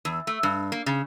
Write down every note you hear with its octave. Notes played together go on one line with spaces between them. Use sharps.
E2
A3
G2
A#3
C#3